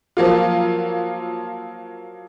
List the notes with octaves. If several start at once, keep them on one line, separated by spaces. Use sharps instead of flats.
F3 F#3 A#3 F4